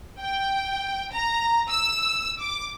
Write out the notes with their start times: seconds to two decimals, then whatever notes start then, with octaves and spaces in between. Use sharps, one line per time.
0.20 G5
1.13 A#5
1.69 E6
2.38 D6